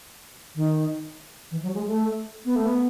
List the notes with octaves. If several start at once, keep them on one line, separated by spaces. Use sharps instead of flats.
D#3
E3
F#3
G#3
A3
B3
A3
B3